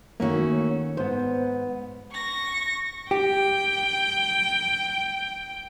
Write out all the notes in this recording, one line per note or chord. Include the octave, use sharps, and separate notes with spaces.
D#3 A3 A#3 C#4 F#4
G#2 B3 C5
C#6 A#6
G4 G5